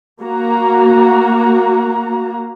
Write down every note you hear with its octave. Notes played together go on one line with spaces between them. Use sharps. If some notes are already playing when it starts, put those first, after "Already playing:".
A#3 F#4 A#5